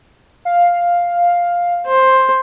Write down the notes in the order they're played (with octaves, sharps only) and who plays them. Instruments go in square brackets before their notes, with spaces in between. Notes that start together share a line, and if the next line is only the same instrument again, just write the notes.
[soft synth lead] F5
[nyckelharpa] C5